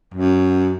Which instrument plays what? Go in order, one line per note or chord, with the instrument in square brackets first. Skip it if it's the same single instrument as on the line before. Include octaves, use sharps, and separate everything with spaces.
[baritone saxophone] F#2